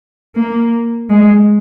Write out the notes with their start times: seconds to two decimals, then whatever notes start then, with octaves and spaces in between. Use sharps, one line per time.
0.35 A#3
1.10 G#3